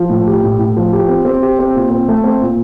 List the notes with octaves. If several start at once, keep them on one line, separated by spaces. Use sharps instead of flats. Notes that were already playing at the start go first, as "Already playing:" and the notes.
Already playing: F3
A2
G4
A2
A2
F3
G4
C4
C4
G4
C4
A#2
C4
A3
C4
A#2